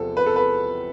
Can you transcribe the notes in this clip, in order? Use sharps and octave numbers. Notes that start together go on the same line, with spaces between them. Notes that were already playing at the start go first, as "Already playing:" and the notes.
Already playing: E2 C3 F3 B3 C4 A4
B4
A4
B4